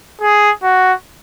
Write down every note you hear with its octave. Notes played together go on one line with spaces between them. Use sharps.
G#4
F#4